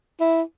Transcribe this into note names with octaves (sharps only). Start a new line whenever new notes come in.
E4